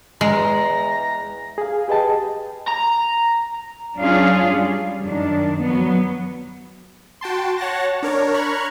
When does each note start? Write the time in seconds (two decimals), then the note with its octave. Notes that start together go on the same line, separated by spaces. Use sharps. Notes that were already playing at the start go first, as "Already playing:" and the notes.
0.21 E2 G#3 A#5
1.58 G#4 F5
1.88 G4 G#4 B4 D#5 G5 A5
2.68 A#5
3.99 F#3 C#4 D4 F4 G#4 F5
4.46 G3
5.04 F#2 D#3 D4
5.61 F#3 B3
7.21 F#4 G5 A5 C6
7.58 C#5 F#5 A5 A#6
8.02 D4 A#4 C#5
8.34 A#5 B5 C#6 F6 F#6 G#6